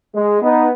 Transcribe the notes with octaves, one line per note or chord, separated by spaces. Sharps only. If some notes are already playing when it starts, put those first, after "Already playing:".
G#3
B3 D#4